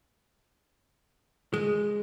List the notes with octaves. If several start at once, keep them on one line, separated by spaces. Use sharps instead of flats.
G#3